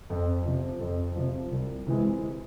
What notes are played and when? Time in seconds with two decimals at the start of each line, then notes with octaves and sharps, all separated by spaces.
0.10 F2
0.46 C3 F3
0.80 F2
1.16 C3 F3
1.51 C2
1.86 C3 E3 G#3